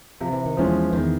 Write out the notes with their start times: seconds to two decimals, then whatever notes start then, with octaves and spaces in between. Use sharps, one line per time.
0.21 C3 F3
0.33 E3
0.46 D#3
0.57 E2 E3 F3 G#3 C#4
0.93 E2 D#3 E3